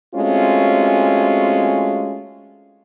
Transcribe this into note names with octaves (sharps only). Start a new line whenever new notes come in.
G#3 A3 C4 C#4 F4 F#4